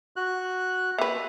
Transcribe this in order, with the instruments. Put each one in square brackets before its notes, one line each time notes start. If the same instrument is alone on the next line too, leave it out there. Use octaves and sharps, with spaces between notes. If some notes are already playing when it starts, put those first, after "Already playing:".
[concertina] F#4 F#6
[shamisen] A#3 B4 [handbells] E5